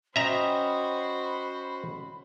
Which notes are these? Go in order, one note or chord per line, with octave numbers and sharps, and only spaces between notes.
C#4 F#4 C5 D#5 E5 G5 A#5 B5